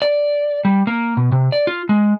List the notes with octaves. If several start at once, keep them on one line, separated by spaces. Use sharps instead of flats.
D5
G3
A#3
B2
C3
D5
F4
G#3